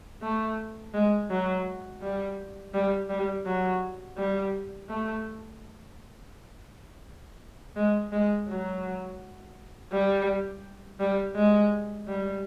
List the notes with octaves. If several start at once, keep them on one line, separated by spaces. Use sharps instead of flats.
A3
G#3
F#3
G3
G3
G3
F#3
G3
A3
G#3
G#3
F#3
G3
G3
G#3
G3